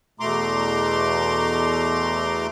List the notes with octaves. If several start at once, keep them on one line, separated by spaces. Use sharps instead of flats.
E2 B2 A3 A#5 C6 D6